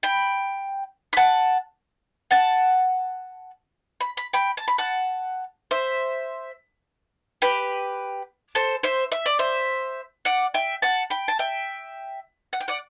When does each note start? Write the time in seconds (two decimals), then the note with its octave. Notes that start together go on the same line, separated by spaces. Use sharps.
0.03 G5 B5
1.13 B5
1.17 F#5 A5
2.31 F#5 A5
4.01 B5
4.17 B5
4.33 G5 B5
4.57 A5
4.68 B5
4.78 F#5 A5
5.71 C5 E5
7.42 G4 B4
8.55 A4 C5
8.83 C5 E5
9.12 E5
9.26 D5
9.39 C5 E5
10.25 D5 F#5
10.54 E5 G5
10.82 F#5 A5
11.10 G5 B5
11.28 A5
11.39 E5 G5
12.53 F#5
12.60 G5
12.68 D5 F#5